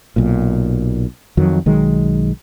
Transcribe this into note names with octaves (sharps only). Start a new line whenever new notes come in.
B1 A#2
F2 D#3 F#3
B1 D#3 F#3 G#3